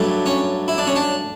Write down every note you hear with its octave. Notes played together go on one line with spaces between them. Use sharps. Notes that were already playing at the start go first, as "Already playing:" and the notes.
Already playing: G2 F#3 A3
C#4
E4
D4
C#4
D4